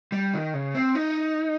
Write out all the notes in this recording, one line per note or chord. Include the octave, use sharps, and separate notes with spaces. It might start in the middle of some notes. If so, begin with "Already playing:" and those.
G3
D#3
C#3
C4
D#4